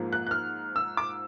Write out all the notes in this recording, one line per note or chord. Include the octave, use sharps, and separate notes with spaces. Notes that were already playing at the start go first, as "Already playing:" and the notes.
Already playing: G#2 F3 A#3
F#6
F#6
F6
E6
D6